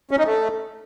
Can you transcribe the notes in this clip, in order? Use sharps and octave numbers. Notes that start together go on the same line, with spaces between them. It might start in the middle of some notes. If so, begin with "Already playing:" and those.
C#4
D#4
A3